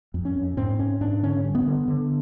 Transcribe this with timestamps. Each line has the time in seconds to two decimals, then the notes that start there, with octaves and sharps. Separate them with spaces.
0.14 F2
0.25 C#4
0.36 F2
0.57 G#2 C4
0.79 G#2 C#4
1.01 G#2 D4
1.23 D3 C#4
1.44 G2
1.55 B3
1.66 D3
1.88 D3